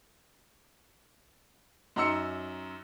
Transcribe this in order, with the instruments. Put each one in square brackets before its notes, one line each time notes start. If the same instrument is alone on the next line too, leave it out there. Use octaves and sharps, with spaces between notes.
[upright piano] F#2 D#4 A#5 C6 E6 C#7